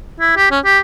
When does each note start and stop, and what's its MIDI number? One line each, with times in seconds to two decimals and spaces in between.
0.20 0.35 64
0.37 0.46 67
0.51 0.59 61
0.65 0.80 67